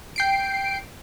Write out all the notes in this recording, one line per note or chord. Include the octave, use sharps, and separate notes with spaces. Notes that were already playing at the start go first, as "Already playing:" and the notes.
G5 C7 D7